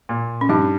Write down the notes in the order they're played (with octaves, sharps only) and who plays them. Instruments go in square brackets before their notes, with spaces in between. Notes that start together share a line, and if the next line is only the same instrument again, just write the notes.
[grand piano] A#2
[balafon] C#4
[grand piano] G2 [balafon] D#4